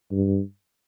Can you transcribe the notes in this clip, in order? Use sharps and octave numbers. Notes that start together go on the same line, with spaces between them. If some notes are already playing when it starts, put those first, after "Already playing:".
G2